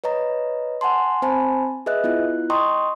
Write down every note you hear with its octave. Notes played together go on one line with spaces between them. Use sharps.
B4 C#5 D#5 A#5
F#5 G#5 A5 C6
C4 C5 G#5 A5 B5
G#4 B4 D#5 E5 F#6
B3 E4 F4 F#6
D#5 G5 A#5 C6 C#6 D#6